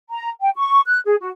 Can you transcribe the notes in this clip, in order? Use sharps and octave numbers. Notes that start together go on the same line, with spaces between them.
A#5
G5
C#6
F#6
G#4
F#4